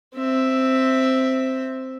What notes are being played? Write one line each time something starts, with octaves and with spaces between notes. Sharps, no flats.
C4 E5